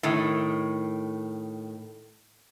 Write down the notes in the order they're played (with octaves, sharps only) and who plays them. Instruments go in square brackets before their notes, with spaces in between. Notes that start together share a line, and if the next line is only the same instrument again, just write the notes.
[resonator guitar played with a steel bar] A2 D#3